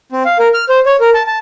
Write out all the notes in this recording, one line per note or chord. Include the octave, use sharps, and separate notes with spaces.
C4
F5
A#4
F6
C5
C#5
A#4
A5
A5